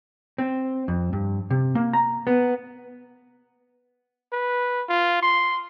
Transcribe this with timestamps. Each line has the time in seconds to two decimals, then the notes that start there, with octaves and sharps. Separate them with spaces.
0.38 C4
0.88 F2
1.13 G2
1.50 C3
1.75 A#3
1.93 A#5
2.27 B3
4.32 B4
4.89 F4
5.22 C6